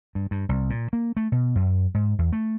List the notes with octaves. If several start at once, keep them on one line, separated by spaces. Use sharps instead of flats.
G2
G2
C2
A#2
A#3
A3
B2
F#2
G#2
E2
A3